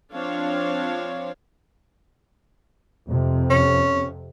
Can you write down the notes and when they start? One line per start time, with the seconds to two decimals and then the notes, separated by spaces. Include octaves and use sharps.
0.13 F3 C4 D4 C#5 F5
3.07 F2 C3
3.50 C#4